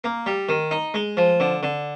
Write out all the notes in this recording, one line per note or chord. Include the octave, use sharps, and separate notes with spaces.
A#3
G3
D#3
D#4
G#3
F3
D3
D3